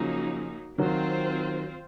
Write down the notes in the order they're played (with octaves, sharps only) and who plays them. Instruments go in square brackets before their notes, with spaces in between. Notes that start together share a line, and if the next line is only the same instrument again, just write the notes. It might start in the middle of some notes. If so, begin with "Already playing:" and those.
Already playing: [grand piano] C#3 F3 [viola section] F#3 A#3 D#4
[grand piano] D#3 F#3 [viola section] C4 F4 C5